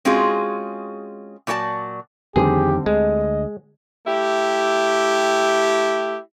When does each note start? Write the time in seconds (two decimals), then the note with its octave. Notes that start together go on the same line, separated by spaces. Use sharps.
0.05 G#3 C4 C#4 F4 F#4 G#4
1.47 A#2 F#3 F#4 D5 A5
2.36 F2 D3 D#3 G3 C4 G4 G#4
2.86 D2 G#3 D#5
4.06 A3 E4 G4